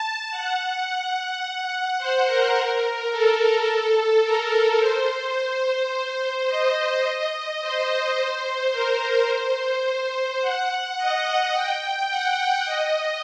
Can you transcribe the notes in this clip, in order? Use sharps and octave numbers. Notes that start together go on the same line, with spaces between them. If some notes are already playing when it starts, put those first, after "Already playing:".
Already playing: A5
F#5
C5
A#4
A4
A#4
C5
D#5
C5
A#4
C5
F#5
D#5
F#5
G5
F#5
D#5